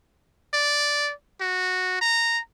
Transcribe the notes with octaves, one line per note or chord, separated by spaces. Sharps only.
D5
F#4
A#5